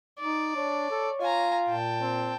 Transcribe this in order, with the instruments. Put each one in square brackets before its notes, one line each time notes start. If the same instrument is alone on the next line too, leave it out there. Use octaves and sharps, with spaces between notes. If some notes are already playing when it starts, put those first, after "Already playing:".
[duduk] D#4 [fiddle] D5
[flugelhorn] D4 [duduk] C#5
[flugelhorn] A4
[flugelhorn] F4 [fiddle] G#5 A#5
[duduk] A#2 [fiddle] G5 A5
[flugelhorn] C4